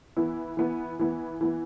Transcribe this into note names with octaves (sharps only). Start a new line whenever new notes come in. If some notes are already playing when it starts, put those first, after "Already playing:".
E3 B3 E4
E3 B3 E4
E3 B3 E4
E3 B3 E4